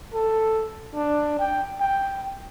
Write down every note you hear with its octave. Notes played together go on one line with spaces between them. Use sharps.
A4
D4
G5
G5